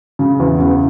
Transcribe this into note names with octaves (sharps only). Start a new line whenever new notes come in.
C#3
E2
C#3